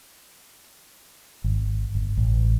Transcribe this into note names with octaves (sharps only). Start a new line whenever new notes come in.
G#1
G1
A1